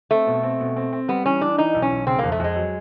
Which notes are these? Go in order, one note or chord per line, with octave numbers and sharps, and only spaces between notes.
A3 C4
B2
C4
B2
C4
C4
G3 B3
E3 C#4
E3 D4
E3 D#4
B1
C#4
B1
C#3 C4
F2 A#3
A3
F2 G#3
F#3